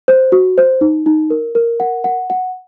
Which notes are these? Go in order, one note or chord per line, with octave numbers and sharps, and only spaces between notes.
C5
F#4
C5
D#4
D#4
A#4
A#4
F#5
F#5
F#5